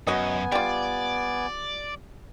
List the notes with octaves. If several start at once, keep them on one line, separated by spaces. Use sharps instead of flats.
F#2 B3 F#4 C#5 D#5 G#5
G3 F4 D5